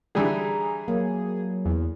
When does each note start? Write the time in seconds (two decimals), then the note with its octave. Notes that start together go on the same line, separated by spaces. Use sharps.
0.15 D3 E3 G3 G#4 A#5
0.88 F#3 A#3
1.65 E2